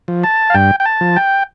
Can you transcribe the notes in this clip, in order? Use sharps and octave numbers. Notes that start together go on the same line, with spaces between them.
F3
A5
F5
G2 G5
G5
A5
F3
G5